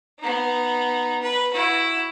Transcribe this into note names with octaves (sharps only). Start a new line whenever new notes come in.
B3 D#4
B4
E4 F#4